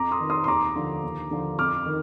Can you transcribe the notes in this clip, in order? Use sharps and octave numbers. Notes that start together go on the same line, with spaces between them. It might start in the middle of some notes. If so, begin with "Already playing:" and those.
Already playing: F2 A#5 D6
C6 D#6
D#3
C6 D#6
C6
D#2 A#5 D6
D3 F3
D#2
D3 F3
F2 D6 F6
D#3